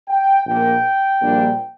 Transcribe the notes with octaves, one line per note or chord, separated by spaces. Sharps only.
G5
A#1 A#2 A#3 G5
A#1 A#2 G3 A#3 D4